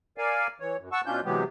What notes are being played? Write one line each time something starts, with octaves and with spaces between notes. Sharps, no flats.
A#4 D5 F5 G#5
E3 C#5
F#2
F#5 A5 C#6 E6
B2 C#4 D4 F4 G6
C3 E3 F#3 G#3 B3 G4